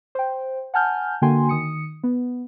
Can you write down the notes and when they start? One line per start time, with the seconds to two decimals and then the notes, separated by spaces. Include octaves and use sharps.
0.15 C5 G5
0.74 F#5 G#5 A5 F6 G6
1.22 D3 A#3 F#4 G5 G#5 C6
1.49 D#3 D#6 C#7
2.03 B3